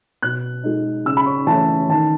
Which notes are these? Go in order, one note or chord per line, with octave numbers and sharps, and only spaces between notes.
B2 F#6
G#3 D#4
C#3 E6
B5
C#6
E3 A3 C#4 A5
D#3 A5